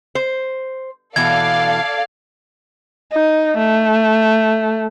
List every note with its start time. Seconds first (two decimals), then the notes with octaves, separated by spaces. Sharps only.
0.15 C5
1.16 B2 E3 A4 D5 F5 G#6
3.13 D#4
3.58 A3